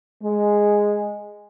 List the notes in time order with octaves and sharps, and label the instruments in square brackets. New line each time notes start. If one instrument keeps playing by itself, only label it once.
[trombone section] G#3